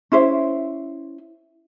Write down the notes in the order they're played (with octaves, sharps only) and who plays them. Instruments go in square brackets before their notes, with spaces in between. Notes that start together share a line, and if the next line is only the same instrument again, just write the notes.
[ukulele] C#4 E4 C5 E5